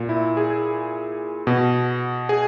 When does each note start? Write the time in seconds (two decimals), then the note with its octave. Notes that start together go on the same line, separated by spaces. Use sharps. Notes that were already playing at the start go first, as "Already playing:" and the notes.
Already playing: A#2
0.09 E4
0.37 G#4
1.47 B2
2.29 G#4